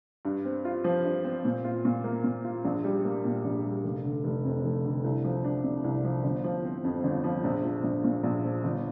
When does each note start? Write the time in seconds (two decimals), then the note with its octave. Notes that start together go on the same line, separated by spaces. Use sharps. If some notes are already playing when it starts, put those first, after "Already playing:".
0.25 G2
0.45 C4
0.65 F4
0.84 F3
1.04 G2
1.24 C4
1.45 A#2
1.64 F4
1.85 A#2
2.04 A#3
2.24 A#2
2.44 F4
2.65 A#1
2.84 G3
3.05 A#3
3.25 A#2
3.44 A#1
3.64 G3
3.84 F1
4.04 D3
4.24 F1
4.44 F2
4.64 F1
4.84 D3
5.04 C2
5.24 F3
5.44 D4
5.64 C3
5.84 C2
6.04 F3
6.24 G1
6.44 F3
6.64 C4
6.84 F2
7.04 G1
7.24 F3
7.44 A#1
7.64 F3
7.84 A#1
8.04 A#2
8.24 A#1
8.44 F3
8.64 G1